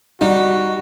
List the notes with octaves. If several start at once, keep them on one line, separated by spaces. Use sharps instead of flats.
G3 D#4 F#4